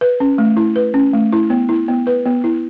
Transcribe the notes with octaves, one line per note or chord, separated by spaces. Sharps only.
B4
C#4
A3
E4
B4
C#4
A3
E4
B3
E4
B3
B4
B3
E4